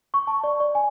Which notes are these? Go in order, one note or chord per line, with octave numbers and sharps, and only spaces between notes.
C#6
A5
D5
D5
G#5